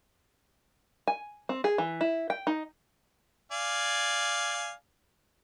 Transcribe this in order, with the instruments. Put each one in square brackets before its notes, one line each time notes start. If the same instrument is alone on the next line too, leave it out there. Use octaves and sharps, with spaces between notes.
[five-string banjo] G#5
C4
G#4
E3
E4
G5
D#4
[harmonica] D5 F5 G#5